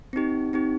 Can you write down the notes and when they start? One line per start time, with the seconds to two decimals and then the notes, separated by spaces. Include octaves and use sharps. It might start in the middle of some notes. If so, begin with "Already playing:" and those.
0.13 C4 D#4 G4
0.53 C4 D#4 G4